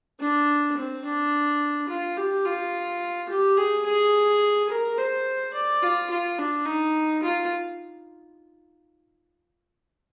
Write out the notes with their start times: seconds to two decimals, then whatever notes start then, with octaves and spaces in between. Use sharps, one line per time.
0.20 D4
0.77 C4
1.05 D4
1.89 F4
2.17 G4
2.45 F4
3.29 G4
3.57 G#4
3.86 G#4
4.70 A#4
4.98 C5
5.54 D5
5.82 F4
6.10 F4
6.38 D4
6.66 D#4
7.23 F4